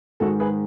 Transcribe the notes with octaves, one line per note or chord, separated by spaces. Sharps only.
G#2 D#3 G#3 F#4 A4
G#4 B4